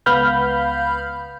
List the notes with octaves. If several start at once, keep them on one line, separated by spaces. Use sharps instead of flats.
C#2 B3 F5 B5 F6 G6